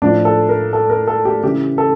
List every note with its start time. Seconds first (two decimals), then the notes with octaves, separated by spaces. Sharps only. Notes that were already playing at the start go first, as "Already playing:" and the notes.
0.02 A2 F3 D4
0.25 A4
0.49 A#4
0.73 A4
0.90 A#4
1.07 A4
1.25 G4
1.43 C#3 E3 G4
1.78 A4